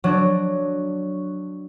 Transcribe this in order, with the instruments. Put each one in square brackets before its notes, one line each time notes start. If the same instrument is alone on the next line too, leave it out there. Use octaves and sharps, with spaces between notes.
[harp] F#3 D4